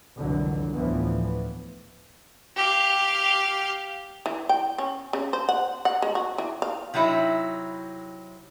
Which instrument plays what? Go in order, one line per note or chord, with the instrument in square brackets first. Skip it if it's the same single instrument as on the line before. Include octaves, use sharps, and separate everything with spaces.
[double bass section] F1 C2 F2 D3 E3 F#3
D2 A2 E3 F3 B3
[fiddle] G4 F5
[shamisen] E3
G5
C#4
C#3
C5
F#5
F#5
G#3
F#4
E3
F5
[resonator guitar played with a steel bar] C3 F#3 D#4 E4